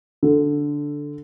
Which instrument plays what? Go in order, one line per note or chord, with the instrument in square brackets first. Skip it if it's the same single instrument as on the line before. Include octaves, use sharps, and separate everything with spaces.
[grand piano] D3